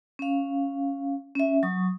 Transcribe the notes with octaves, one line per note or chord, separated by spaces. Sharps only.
C#4 F5
C#4 E5
F#3 C#6 D#6